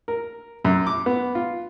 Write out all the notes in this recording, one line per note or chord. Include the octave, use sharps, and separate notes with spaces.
A#4
F#2
D6
B3
F4